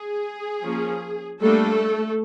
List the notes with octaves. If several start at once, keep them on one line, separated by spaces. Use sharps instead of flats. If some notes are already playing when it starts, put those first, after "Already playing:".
Already playing: G#4
F3 A#3 C#4
G3 A3 A#3 D4 A4